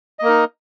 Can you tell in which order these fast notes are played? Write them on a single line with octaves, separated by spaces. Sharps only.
D#5 A#3 A#4 D#4